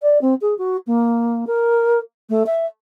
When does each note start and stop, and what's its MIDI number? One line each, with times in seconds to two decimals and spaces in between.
0.02 0.21 74
0.21 0.34 60
0.41 0.56 68
0.58 0.77 66
0.87 1.45 58
1.47 1.99 70
2.30 2.43 57
2.46 2.66 76